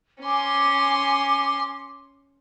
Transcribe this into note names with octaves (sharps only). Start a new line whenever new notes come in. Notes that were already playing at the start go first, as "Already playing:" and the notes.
C#4 G#5 C6 D6